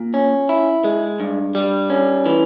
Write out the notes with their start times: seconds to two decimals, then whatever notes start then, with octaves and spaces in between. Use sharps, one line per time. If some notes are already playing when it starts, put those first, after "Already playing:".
Already playing: A#2
0.14 C#4
0.49 E4
0.84 G#3
1.20 G2
1.55 G3
1.90 C#4
2.26 E3